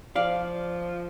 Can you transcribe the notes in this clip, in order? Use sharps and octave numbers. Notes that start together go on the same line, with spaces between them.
F3 D5 F5